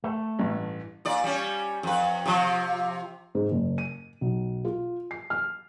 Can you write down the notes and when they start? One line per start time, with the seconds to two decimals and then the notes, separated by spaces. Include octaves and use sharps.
0.04 A3
0.39 A1 G2
1.05 A#2 D5
1.24 G3 C#4
1.83 F2 B4
2.26 C3 F3
3.35 G#2
3.51 F#1
3.78 D#7
4.21 B1
4.65 F4
5.11 C7
5.30 F6